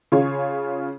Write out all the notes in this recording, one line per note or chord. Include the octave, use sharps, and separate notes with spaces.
C#3 F4 G#4 C#5